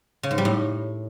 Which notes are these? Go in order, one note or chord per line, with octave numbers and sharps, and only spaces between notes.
C#3
G#2
G3
A2